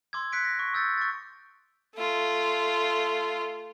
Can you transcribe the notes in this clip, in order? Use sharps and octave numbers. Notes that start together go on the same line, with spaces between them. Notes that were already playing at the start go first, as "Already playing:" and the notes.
C6 D6 E6 G#6
F#6 B6 C#7 D7
A#6
C#6
D#6 E6 G6 A6 C#7
C#6 A6
A3 F4